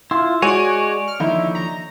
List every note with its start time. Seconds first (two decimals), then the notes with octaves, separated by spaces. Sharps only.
0.11 E4 F4 C6
0.42 G#3 F#4 C#5 D5 G#5 D#7
1.07 F6
1.20 D#2 D3 F3 D#4 E4
1.55 A#5